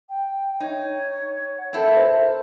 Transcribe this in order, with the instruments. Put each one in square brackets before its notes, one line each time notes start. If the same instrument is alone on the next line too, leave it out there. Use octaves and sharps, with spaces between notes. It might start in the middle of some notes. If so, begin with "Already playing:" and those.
[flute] G5
[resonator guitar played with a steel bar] D#4 [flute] C#5
[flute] F#5
[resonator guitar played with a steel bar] C4 E4 A4 [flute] A#4
[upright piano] C5